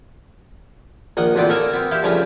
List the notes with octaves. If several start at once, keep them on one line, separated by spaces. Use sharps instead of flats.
A#1 D#3 D#5 F#5
A1 D2 A#2 B3 C4 D5
A#3 A4 A#4 G#5
B3 C4
E4 G4 C5 F5
G2 C#3 F3 A3